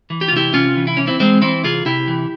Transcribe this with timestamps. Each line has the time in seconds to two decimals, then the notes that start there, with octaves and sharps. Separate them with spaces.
0.10 E3
0.21 G4
0.28 F4
0.32 C3 E4 G4
0.54 C3 C#4 F4
0.76 E3
0.87 E4
0.97 E3 C#4
1.07 C4 E4
1.20 E3 G#3 C4
1.42 E3 C4 E4
1.64 C3 F4 G#4
1.85 C3 E4 G4
2.08 E3